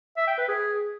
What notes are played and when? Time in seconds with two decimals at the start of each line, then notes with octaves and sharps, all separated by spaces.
0.17 E5
0.28 G5
0.38 B4
0.49 G#4